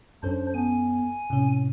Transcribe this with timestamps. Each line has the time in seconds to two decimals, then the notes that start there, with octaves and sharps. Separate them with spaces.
0.23 F#2 C#4 D4 A4 C5
0.54 B3 G#5
1.30 A2 C3 C#4